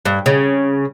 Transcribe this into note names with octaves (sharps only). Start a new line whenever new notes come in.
G2
C#3